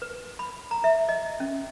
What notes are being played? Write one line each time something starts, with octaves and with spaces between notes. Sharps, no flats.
B4
B5
A#5
E5
D#5
C#4